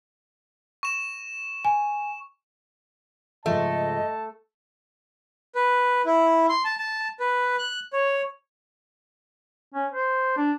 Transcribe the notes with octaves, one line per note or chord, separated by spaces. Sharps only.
C#6 E7
G#5
G#2 C#3 F3 A3 D#5 A5
B4
E4
C6
A5
A5
B4
F#6
C#5
C#4
C5
D4